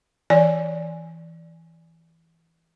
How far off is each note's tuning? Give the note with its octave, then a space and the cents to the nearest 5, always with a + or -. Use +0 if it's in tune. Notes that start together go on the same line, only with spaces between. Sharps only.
E3 +0 D5 +0 G#5 +0